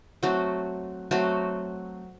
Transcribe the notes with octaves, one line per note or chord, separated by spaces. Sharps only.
F#3 A3 C4 F#4
F#3 A3 C4 F#4